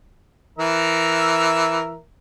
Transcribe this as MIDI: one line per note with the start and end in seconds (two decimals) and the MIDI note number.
0.58 1.99 52
0.58 1.99 70
0.58 1.99 76